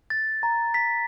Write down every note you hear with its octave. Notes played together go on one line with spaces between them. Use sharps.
A6
A#5
B6